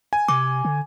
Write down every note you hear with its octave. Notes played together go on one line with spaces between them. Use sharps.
G#5
C3 D6
D3